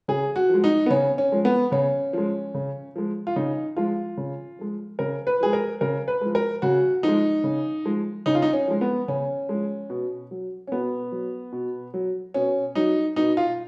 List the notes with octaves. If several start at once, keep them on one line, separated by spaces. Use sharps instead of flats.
C#3 G#4
F#4
F3 G#3
D#4
B3
C#3 C#4
C#4
F3 G#3
B3
C#3 C#4
F3 G#3
C#3
F3 G#3
F4
C#3 D#4
F3 G#3 F4
C#3
F3 G#3
C#3 A#4
B4
F3 G#3 G#4
A#4
C#3 A#4
B4
F3 G#3
A#4
C#3 F#4
F3 G#3 D#4
C#3
F3 G#3
C#3 D#4
F4
D#4
C#4
F3 G#3
B3
C#3 C#4
F3 G#3
B2
F#3
C#4
B2 B3
F#3
B2
F#3
B2 C#4
F#3 D#4
B2 D#4
F4